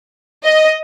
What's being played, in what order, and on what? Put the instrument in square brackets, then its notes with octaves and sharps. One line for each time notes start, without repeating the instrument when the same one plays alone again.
[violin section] D#5